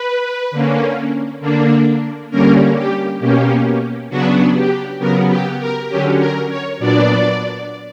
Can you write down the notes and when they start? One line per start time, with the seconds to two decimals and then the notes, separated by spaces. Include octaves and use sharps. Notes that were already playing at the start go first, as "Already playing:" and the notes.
Already playing: B4
0.51 D3 A#3 C#4
1.41 D3 A#3 D4
2.31 D3 G3 A#3 C#4 A#4
2.76 G4
3.20 B2 A#3 C#4 G4
4.10 C#3 F#3 B3 D4 F#4
4.55 G4
4.99 C#3 F#3 B3 A#4
5.30 G4
5.60 A#4
5.89 D3 F#3 C#4 G4
6.19 A#4
6.49 C#5
6.79 A#2 F#3 B3 D4 D5